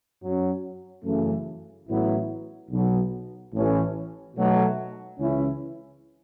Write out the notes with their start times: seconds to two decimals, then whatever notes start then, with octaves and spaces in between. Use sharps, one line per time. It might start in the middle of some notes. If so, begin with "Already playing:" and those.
0.22 F#2 F#3 C#4
1.05 F#2 C#3 E3 A3
1.88 A1 A2 F#3 B3 E4
2.71 B1 B2 F#3
3.53 A1 A2 E3 C#4
4.36 B1 B2 F#3 A3
5.19 C#2 C#3 E3 C#4 E4